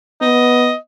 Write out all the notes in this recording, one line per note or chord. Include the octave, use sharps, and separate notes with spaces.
B3 D#5